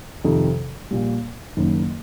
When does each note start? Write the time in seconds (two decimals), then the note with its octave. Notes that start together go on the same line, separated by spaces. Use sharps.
0.24 F2 C3 D#3
0.91 A#1 A#2 G3
1.57 F#1 F#2 D#3